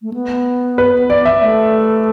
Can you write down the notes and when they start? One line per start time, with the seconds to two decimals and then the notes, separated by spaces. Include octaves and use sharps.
0.02 A3
0.14 B3
0.78 B4
1.10 D5
1.25 E5
1.42 A3